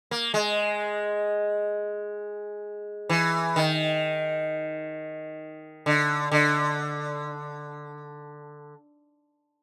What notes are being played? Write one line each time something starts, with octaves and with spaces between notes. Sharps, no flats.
A#3
G#3
E3
D#3
D3
D3